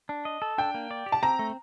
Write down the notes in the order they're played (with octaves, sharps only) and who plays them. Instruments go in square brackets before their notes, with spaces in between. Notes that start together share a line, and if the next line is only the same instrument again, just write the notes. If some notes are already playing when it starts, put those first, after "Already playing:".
[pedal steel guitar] D4
D#5
A4
[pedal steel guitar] D4 [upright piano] G5
[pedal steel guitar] A#3
D5
G4
[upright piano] A5
[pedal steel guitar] C4 [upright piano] A#5
[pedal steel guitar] A3